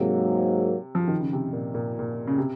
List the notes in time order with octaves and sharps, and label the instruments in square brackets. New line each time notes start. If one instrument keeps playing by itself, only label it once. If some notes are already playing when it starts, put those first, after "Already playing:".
Already playing: [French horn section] G#2 F#3 A#3 [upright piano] C3
[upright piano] F3
D#3
C#3
C3
A#2
A#2
A#2
C#3
C3